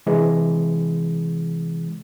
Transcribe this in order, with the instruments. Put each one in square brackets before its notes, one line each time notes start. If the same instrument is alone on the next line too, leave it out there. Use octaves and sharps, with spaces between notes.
[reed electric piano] C3 E3 G#3